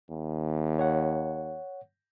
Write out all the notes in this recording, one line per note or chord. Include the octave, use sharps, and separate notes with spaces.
D#2
C#5 F#5